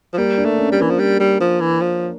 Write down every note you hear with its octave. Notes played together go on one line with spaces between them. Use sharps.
F3
G3 A#3
D4
A3
C#4
G3
E3 A#3
F3
G3
G3
F3
E3
F3